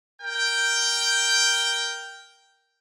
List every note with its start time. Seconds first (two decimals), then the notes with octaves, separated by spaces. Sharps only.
0.22 A#4 G5